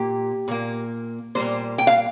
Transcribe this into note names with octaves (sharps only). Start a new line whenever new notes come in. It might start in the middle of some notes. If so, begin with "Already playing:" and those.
Already playing: A#2 A#3 G4
A#2 A#3
A#2 G3 A#3 C5
G5
F5